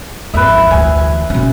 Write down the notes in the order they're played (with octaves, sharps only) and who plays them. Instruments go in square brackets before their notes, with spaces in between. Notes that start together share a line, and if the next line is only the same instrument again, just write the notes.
[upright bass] G#1 F2 [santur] B4 E5
[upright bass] D2 E3 [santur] G#5
[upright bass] B2 C#4